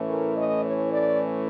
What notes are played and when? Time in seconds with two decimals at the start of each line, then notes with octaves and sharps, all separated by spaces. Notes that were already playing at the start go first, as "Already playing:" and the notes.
Already playing: A2 E3 A3 C#4
0.09 A#4
0.37 D#5
0.65 C#5
0.93 D5